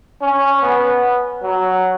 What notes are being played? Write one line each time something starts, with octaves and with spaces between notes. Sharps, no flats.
C#4
B3
F#3